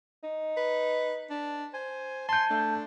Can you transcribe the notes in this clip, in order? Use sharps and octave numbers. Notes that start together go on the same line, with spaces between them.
D#4
B4
D4
C5 G#5
A5 C6 G6
A3 D4